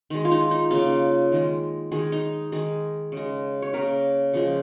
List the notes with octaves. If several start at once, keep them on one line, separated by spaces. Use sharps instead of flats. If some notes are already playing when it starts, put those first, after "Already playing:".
D#3 G#3
F4
D#4
D#4
C#3 A#3 F4
D#3 G#3
D#3 G#3 G#4
D#4
D#3 G#3 G#4
C#3 G#3
C#5
C#3 A#3 A#4
C#3 F3 G#3